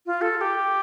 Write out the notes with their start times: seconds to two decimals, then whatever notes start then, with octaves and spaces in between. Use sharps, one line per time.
0.06 F4
0.22 A4
0.38 A4
0.41 G4